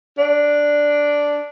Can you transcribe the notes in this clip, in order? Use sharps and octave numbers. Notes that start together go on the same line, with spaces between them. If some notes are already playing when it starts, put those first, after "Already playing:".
D4